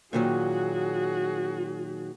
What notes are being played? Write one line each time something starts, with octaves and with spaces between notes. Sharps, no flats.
A#2 D#3 F#3 F#4 G#4